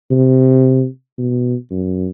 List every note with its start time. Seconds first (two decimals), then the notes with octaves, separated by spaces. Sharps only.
0.11 C3
1.18 B2
1.71 F#2